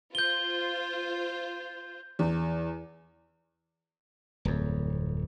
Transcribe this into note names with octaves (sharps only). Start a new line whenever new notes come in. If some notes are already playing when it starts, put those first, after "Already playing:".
F4 C5 G6 G7
E2
D1 F2